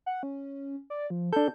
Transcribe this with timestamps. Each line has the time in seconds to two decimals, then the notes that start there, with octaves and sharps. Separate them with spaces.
0.06 F#5
0.23 C#4
0.90 D5
1.10 F3
1.33 D4 A4 G6